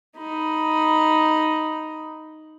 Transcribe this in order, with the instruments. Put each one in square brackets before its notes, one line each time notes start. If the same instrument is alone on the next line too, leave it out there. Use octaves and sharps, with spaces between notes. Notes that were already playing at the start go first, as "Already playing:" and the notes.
[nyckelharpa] D#4 B5